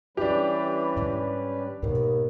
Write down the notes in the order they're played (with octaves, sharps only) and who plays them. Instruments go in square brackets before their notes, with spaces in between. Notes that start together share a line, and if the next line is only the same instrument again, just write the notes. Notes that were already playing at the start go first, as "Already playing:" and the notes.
[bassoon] E3 [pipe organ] G3 C#4 B4 [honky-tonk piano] D4 G4
[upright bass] G#2 D3
[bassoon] D#2 [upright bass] G#2 B2 [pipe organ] B3